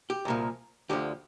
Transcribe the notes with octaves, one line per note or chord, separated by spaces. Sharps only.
G4
C2 A#2 F3
D2 D3 F3 G4